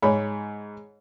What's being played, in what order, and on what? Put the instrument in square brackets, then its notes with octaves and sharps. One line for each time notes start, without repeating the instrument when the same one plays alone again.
[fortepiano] G#2 C#5 B5